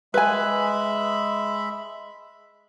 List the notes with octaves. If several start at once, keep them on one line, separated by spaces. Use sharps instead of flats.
G#3 B4 E5 G#5 B5